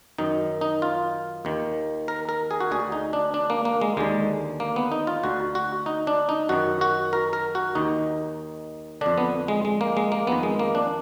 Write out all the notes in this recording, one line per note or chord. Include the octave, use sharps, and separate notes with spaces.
F#2 D#3 D#4
D#4
F4
D#2 D#3
A#4
A#4
G#4
F#4
D2 D3 G#4
D#4
D4
D4
A#3
A#3
G#3
D#2 D3 G#3
A#3
B3
D#4
F4
D2 D3 F#4
F#4
D#4
D4
D#4
F#2 D#3 F#4
F#4
A#4
A#4
F#4
D#2 D#3 D#4
F2 D3 D4
B3
G#3
G#3
A#3
G#3
A#3
F2 D#3 B3
G#3
A#3
D4